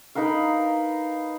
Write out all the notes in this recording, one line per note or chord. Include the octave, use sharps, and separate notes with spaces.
D#4 A#4 B4 F5